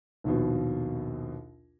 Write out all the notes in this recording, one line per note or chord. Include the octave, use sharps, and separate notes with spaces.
A#1 D#2 B2